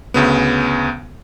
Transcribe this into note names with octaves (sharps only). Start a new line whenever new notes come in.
D2 C#3 B3